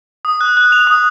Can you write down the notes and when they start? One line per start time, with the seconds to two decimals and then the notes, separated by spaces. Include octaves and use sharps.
0.25 D#6
0.41 F#6
0.57 F#6
0.72 F7
0.87 D#6